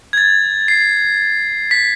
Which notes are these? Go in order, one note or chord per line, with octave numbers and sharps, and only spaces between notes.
G#6
A6
C7
B6